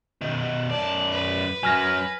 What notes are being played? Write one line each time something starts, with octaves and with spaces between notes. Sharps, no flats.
B2 D#3
F#2 D5 A5
B4
F#2 F#3 G#5 F6 A#6